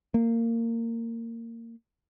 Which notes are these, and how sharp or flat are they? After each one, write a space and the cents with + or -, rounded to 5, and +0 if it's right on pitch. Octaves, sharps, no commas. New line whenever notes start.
A#3 -20